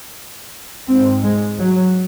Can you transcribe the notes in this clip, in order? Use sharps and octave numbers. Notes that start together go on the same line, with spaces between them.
G#2 C4
G#3
F#3